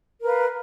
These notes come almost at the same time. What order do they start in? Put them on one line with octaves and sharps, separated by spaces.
A#4 B4 F5